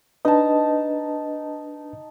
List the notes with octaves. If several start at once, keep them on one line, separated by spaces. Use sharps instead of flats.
D4 D#4 B4 D#5 A5